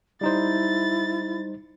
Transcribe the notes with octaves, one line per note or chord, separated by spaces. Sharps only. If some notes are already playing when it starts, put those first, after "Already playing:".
G3 D#4 E4 C5 A6